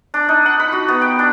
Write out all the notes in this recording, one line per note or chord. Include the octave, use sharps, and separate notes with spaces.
D4
D#4
F#5
B5
F#4
B3
G5
D4